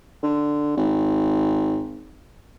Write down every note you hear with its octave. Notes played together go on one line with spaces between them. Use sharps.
D3
G#1